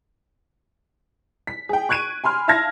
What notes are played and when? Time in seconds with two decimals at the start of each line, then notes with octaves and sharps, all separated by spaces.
1.47 B6
1.69 G#4 G5
1.89 C#6 F#6 G#6 D7 D#7
2.24 G#5 B5 C6 F6
2.48 E5 F5 A5 F6 G#6 A#6